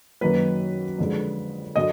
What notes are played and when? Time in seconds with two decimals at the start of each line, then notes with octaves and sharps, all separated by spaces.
0.21 F#2 D#3 F#3 A#3 B4
0.99 F2 D3 G#3
1.76 D3 F#3 D#5